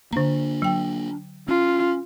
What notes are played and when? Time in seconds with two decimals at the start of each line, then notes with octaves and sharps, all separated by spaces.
0.13 D3 A#3 D4 A#5
0.62 F#3 G5
1.48 C#4 F4